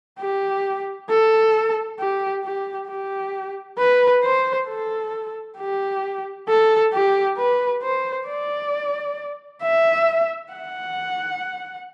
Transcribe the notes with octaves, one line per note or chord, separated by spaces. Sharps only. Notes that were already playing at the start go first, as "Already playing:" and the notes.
G4
A4
G4
G4
G4
B4
C5
A4
G4
A4
G4
B4
C5
D5
E5
F#5